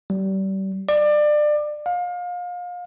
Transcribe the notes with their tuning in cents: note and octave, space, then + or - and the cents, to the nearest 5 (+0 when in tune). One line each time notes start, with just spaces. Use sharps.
G3 -30
D5 +25
F5 +30